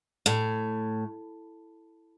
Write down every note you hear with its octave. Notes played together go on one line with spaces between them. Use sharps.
A2